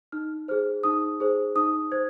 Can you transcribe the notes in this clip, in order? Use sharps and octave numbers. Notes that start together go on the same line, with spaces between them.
D#4 F6
G#4 C5 F6
D#4 D#6
G#4 C5
D#4 D#6
C5 G#6